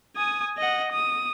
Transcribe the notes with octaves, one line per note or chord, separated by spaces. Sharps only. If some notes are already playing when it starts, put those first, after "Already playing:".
G#5 D#6
D#5 F#5
D#6